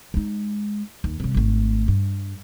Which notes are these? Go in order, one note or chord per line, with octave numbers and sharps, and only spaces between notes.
G#3 D#4
D#2
C3 G3
G#1 A3
G2